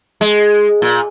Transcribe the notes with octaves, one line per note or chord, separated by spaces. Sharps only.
G#3
A#2